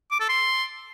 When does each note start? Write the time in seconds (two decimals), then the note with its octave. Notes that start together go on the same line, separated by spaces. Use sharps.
0.11 D6
0.20 A4
0.29 C6